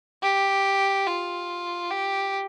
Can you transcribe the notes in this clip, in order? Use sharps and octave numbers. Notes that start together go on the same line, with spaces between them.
G4
F4
G4